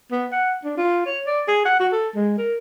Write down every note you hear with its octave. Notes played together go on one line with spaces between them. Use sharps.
B3
F#5
D4
F4
C#5
D5
G#4
F#5
F#4
A4
G#3
A#4